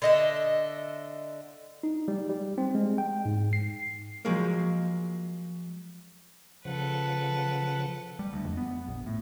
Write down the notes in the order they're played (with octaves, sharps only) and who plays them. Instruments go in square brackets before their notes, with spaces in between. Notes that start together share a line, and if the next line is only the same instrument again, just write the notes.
[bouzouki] D3 D#5 E5
[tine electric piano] D#4
G3
G3
C4
G#3
G5
G#2
C7
[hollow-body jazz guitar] F3 F#3 G#3 A#3
[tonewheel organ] C#3 F3 F#5 [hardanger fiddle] A4 B4
[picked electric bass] G3
D2
F2
B3
A#1
A2